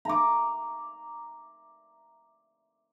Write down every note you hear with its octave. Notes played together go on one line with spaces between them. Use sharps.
A#5 D6